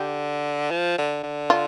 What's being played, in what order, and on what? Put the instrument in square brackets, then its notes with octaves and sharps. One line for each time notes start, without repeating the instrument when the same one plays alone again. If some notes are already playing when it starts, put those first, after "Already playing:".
Already playing: [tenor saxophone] D3 [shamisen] G4
[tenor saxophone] F3
D3
D3
[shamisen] F4